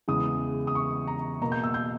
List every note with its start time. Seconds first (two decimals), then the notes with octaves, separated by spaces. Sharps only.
0.08 E2 C#3 E3 G#3 B3 D#6
0.67 D#6
0.75 C#6
1.07 A#5
1.42 B2 A#3 A#5
1.52 G6
1.64 E6
1.74 G6